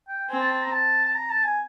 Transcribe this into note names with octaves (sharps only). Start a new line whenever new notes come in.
G5
C4 G#5
A5
A5
A#5
A5
A5
A#5
A5
G#5